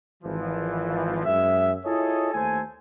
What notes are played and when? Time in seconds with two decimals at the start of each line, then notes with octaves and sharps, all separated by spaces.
0.23 G#1 E3 F3
1.25 F#2 G#3 E5
1.85 E4 F4 G#4 A4 C#5 D#5
2.33 D#2 A3 A4 C5 G#5